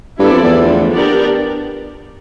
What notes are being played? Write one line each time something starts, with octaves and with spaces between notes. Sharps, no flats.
G2 B3 E4 A4 D5
F2
E2
D3 F3 A3
B3 D4 G4 A#4 D5